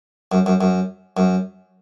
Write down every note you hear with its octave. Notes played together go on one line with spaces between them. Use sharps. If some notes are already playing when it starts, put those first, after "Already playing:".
F#2
F#2
F#2
F#2